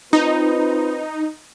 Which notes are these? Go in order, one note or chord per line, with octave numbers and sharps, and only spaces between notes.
C4 D#4 F4 B4